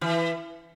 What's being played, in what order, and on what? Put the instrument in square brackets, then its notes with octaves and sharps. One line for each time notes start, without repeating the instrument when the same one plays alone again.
[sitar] E3